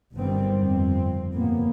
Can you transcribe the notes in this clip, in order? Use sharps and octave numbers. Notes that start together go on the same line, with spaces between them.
G1 D3 D#3 G3 B3 C4
F2 C4
G1 A2 A#3 B3